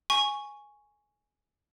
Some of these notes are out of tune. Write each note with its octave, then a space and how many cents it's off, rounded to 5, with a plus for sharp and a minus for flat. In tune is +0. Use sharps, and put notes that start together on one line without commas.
G#5 +0 C#6 +0